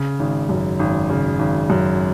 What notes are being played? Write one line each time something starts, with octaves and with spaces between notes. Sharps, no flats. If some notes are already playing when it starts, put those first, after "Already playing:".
Already playing: C#3
G#1
F#2
G#1
C#3
G#1
F#2